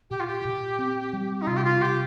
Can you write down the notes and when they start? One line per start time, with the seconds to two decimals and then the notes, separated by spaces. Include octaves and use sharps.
0.10 A#2 G4
0.20 F4
0.27 G4
0.45 A#2
0.79 C4
1.13 G3
1.42 D#4
1.47 C3 F4
1.57 G4
1.64 F4
1.81 C3 G4